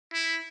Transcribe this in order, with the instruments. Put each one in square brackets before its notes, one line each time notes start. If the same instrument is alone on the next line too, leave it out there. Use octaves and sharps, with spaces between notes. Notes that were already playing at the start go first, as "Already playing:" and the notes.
[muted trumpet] E4